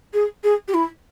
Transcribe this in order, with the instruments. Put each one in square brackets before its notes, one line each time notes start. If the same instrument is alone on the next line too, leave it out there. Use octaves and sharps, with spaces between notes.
[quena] G#4
G#4
G4
E4